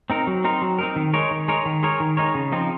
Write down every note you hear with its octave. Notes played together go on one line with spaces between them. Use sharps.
C4 D#4 A#4
F#3
C4 D#4 A#4
F#3
C4 D#4 A#4
D#3
G#3 D#4 A#4 C#5
D#3
G#3 D#4 A#4 C#5
D#3
G#3 D#4 A#4 C#5
D#3
G#3 D#4 A#4 C#5
C#3
F3 C4 D#4